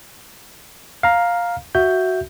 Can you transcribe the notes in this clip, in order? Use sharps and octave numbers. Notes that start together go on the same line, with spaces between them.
F5 A#5
F#4 E5 G6